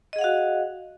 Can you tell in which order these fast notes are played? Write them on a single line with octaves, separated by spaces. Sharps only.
D#5 G#4 F#5 F5 F#4